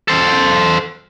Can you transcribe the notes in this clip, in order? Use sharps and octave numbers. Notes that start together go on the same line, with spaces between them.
A4 C5